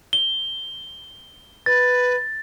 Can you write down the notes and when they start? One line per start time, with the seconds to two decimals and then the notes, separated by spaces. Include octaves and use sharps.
0.13 G7
1.66 B4 A6